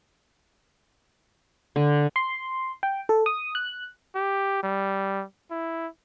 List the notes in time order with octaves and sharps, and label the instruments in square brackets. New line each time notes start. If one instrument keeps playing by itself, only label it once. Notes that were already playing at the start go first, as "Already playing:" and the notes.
[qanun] D3
[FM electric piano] C6
G5
A4
D#6
F#6
[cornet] G4
G3
E4